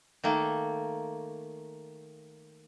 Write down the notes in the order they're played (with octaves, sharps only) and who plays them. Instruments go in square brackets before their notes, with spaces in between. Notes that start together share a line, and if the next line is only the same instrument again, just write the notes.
[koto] D#3 A3 A#3